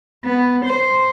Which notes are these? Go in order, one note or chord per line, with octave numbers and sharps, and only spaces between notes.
B3
C5